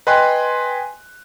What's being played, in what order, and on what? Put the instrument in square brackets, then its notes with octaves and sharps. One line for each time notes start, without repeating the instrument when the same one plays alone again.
[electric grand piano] B4 D#5 G5 G#5 C6 F#6